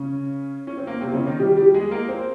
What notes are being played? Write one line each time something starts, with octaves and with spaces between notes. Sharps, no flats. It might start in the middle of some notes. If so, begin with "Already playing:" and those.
Already playing: C#3 C#4
C#4
C4
A#3
C3 C4
C#3 C#4
D#3 D#4
G3 G4
G3 G4
G#3 G#4
A#3 A#4
C4 C5